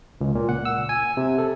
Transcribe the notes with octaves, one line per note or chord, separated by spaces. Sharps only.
C#2
A#2
F#5
E6
G#5
C3
A4